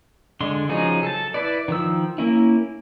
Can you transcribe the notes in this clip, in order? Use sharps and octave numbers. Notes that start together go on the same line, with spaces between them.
D3 G#3 C6
C#3 F3 F#3 D#4 G#4
A4 A5
E4 B4 D5
D#3 F3 E6
A#3 C#4 E4